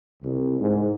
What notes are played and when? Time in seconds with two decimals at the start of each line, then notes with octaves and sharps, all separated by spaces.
0.23 C2
0.61 G#2